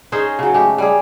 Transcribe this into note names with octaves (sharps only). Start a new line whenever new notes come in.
C#4 D#4 G#4 C5
C#3 F#3
G#3 A3 G4
G3 G#4